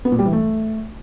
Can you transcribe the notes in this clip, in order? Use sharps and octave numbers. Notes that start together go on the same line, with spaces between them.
B3
A#2
G3
E3
A3